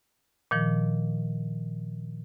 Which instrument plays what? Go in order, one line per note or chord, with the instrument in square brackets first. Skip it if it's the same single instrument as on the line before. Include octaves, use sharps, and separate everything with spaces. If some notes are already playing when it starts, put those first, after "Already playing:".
[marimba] A#2 D#3 F3